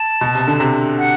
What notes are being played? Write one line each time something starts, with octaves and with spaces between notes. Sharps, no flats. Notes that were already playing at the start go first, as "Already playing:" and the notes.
Already playing: A5
B2
C3
D3
C3
F#5